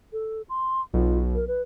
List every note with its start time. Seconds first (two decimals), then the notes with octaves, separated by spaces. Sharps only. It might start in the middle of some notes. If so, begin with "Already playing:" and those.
0.13 A4
0.49 C6
0.94 B1 F4
1.35 A#4
1.48 B4